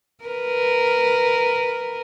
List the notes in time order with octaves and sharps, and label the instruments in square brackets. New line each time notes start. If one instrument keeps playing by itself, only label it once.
[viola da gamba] A#4 B4